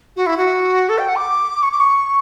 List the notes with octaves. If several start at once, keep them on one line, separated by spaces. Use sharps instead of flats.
F#4
E4
F#4
A4
G5
F#5
D6
C#6
D6
C#6